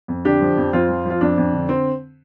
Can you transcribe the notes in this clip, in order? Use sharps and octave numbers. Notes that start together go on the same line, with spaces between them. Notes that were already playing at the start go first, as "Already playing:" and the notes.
F2
D3 D4 G4
F3
F2
F2 C4 F4
F3
F3
F4
F2 D4
F2
D3
C4